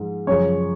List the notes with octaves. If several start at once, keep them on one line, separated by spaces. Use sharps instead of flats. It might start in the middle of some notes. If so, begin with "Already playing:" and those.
Already playing: G#2 F3 G#3
F#2 C#3 F3 G#3 C#5